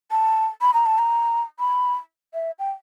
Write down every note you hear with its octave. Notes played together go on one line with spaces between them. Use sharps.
A5
B5
A#5
A5
A#5
B5
E5
G5